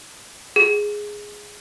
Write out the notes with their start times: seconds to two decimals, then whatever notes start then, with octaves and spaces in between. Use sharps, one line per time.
0.56 G#4